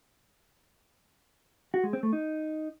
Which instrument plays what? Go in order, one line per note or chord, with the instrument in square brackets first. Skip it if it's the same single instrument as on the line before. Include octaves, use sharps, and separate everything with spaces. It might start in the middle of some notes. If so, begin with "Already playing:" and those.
[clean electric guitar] F#4
G#3
C4
A3
D#4